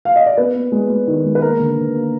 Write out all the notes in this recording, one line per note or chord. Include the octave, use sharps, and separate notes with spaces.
F5
D#5
D5
B3 B4
B3
G#3
G#3
D#3
G#3
B4
A#3 A#4
D3
D3
A#3